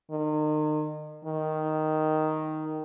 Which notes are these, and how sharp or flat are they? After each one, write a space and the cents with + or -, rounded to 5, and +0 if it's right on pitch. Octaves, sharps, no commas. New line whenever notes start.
D#3 -35
D#3 +0